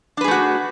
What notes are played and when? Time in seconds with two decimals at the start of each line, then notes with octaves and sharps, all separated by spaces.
0.17 D4
0.21 B4
0.24 G#4
0.28 A3
0.31 F#4